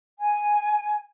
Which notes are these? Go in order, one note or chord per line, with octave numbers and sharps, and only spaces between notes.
G#5